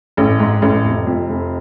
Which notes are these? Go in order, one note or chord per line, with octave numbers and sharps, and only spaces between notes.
A1
G#2
A1
F1
F2
F1